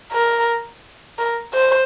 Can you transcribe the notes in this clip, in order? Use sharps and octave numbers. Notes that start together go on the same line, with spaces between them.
A#4
A#4
C5